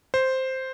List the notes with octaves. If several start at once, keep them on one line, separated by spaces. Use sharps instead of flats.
C5